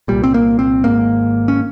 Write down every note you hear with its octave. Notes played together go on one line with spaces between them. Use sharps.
C2 A#2 G3
C4
A#3
C4
G#1 G#2 A#3
C#4